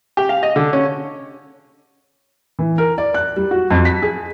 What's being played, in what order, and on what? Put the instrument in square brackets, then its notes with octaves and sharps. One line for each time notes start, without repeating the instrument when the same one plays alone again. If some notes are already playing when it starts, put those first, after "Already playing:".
[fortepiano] G4
F5
D#5
D3
C#4
[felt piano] E3
A#4
D5
F#6
G3
F#4
F2
B6
G#4